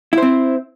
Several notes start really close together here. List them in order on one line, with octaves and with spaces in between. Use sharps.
E4 C5 C4